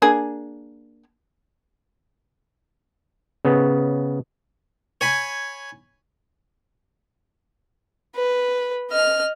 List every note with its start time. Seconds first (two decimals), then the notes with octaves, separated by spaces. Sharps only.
0.02 A#3 D4 G#4
3.45 C#3 B3
5.01 C#5 G#5 B5
8.16 B4
8.91 D#5 F6